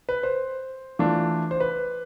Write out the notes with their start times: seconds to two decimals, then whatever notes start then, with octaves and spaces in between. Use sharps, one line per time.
0.09 B4
0.23 C5
0.99 E3 A3 D4 F4
1.51 C5
1.60 B4